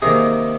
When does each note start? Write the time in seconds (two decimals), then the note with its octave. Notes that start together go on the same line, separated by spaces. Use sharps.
0.02 C3 D#3 A#3 D#4 G#4